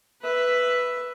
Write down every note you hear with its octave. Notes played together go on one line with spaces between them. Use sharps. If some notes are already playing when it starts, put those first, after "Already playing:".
B4 E5